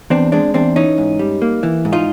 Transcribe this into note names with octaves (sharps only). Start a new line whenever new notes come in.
E2 C4 D4
G#3 C4 D4
E2 C4 D4
E3 C#4 D#4
G#2
G3
A#3
E3
G#2
D#4 F4